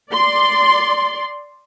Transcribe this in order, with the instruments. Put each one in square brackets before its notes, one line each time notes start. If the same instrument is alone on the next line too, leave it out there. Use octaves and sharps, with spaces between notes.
[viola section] D5 C6